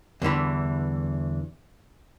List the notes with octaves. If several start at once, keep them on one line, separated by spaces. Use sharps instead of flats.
E2 G2 D3 E3